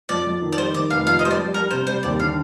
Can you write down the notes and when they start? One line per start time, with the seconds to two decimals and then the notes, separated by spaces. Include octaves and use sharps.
0.09 F2 D5
0.26 F2
0.41 D#3
0.52 D5
0.57 G3 C5
0.74 D#3 D5
0.90 F1 F5
1.06 F2 F5
1.19 D#5
1.23 G3 C5
1.31 D5
1.38 G3
1.54 G3 A#4
1.71 C3 C5
1.87 G3 C5
2.03 D#2 D5
2.20 D3 F5